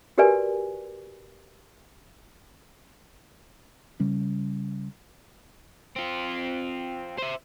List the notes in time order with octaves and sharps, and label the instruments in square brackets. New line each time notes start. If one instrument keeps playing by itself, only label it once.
[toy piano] F#4 G4 A#4 B4 D5 G#5
[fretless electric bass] C#3 G3 C#4
[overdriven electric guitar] C4 F4
C5 E5